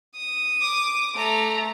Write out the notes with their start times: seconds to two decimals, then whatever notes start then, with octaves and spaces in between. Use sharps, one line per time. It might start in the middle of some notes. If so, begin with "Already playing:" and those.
0.15 D#6
0.61 D6
1.16 A3 A#5